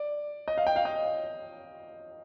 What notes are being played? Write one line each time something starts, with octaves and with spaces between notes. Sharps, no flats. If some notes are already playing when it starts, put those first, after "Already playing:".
Already playing: D5
D#5
F5
G5
F5
D#5